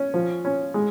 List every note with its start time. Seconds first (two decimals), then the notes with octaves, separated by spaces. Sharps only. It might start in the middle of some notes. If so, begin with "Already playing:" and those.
Already playing: C#4
0.14 F3
0.45 C#4
0.74 G#3